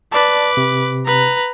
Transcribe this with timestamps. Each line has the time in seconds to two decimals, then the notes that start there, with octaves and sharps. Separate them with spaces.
0.12 B4 D5 A5 D6
0.57 C3
1.05 B4 A#5